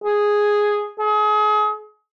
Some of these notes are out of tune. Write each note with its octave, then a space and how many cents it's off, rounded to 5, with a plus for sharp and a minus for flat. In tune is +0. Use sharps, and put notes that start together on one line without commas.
G#4 +0
G#4 +35